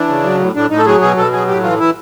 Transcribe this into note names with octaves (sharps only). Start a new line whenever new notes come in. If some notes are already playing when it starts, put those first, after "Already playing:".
Already playing: E3 D4
C#3
F#3
A2
A2 D4
A2 D#4
A4
F#3 G#4
B2 G#4
B2 A4
F#3 G#4
A2 G4
E3 F4
E3 E4